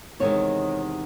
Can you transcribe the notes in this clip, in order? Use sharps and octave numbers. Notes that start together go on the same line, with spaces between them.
E2 C3 D#3 G#3 C#5